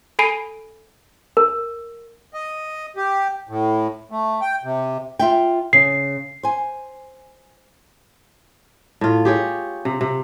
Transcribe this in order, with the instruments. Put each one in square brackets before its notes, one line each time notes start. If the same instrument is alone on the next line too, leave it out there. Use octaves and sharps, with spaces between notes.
[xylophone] A4 G#5 B5 C7 D7 D#7
[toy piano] A#4
[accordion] D#5
G4
A2
A3
G5
C3
[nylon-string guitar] F4 E5 G5
[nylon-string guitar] C#3 [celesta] C7
[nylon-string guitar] C5 G#5
[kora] A2 F4
G4 G#4 C#5
C3
C3